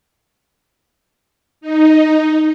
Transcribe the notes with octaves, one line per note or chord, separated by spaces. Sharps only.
D#4